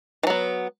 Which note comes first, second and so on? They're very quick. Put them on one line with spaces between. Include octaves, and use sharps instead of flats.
E3 F#3 B3